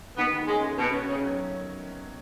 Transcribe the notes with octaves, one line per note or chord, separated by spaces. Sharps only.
D#3 B3
D#3
G#3 C#4
A3
B2 C#4
C#4
C#3 C#4
F#3